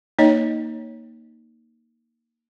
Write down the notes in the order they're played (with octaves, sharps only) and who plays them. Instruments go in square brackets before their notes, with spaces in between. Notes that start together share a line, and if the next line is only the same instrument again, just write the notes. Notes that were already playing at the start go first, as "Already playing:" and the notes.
[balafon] A#3 D#4 C#5 D#5